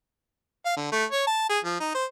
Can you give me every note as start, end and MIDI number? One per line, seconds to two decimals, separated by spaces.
0.65 0.76 77
0.77 0.91 50
0.92 1.05 57
1.12 1.26 73
1.27 1.45 81
1.50 1.59 68
1.65 1.80 53
1.80 1.91 63
1.94 2.05 72